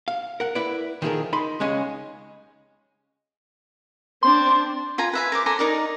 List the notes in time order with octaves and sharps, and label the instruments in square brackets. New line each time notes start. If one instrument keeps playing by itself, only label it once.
[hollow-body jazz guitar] F5
A#4 F#5
E4 B4 D5
D#3 F3 A3 D#4 G#4 A#4
D#4 B5 C6
C#2 G#3 C#4 D#5
[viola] C4 D4 [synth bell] C6
[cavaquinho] F4 G#5 A#5
B4 E5 G#5
A#4 C5 D6
A4 G#5 A#5 C6
D#4 A#4 D5